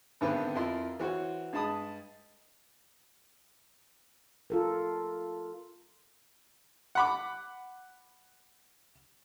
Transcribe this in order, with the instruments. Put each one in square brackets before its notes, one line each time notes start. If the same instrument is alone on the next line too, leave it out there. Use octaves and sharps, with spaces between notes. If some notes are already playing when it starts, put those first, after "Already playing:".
[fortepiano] G#1 D3 D#3 B3 C4 B4
F2 E4 F4 A#4 C6
E3 F#4 C5 C#5
G2 G#3 A5 B5 D#6
[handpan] F4 A4 A#4
[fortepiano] F#5 B5 D6